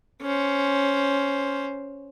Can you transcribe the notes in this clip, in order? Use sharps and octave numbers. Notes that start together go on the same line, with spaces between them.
C#4 C5